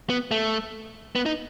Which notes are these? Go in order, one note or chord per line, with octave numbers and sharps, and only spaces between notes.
B3
A3
B3
D#4